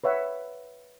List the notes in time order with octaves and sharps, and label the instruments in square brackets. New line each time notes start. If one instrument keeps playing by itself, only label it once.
[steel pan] B4 C#5 E5 F#5